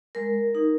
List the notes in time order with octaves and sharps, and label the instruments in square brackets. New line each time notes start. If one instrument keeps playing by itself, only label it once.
[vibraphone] G#3 A#4
D#4